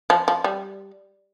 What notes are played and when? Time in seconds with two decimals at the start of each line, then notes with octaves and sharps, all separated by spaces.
0.10 F3
0.28 F3
0.44 G3